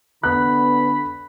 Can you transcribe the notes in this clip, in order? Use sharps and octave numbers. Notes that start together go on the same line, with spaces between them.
D3 B3 B5 F#6